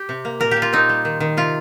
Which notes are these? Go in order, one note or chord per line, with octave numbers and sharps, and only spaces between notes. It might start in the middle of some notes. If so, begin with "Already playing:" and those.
Already playing: G4
C3
A#3
A#2 A#4
G4
A#2
F4
C4 D#4
G3
D#3
D#3
C3 F4